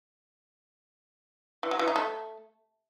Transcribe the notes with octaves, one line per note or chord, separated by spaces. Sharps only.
E3
F#3
E3
D#4
A3